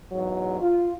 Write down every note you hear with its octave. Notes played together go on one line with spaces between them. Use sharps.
E2 G#2 F#3
F4